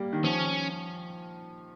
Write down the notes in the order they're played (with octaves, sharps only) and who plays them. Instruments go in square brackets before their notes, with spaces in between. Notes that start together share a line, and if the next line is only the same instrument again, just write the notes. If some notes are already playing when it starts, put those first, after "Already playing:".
Already playing: [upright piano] G3 A#3
D#3
[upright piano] F3 [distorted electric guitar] C#4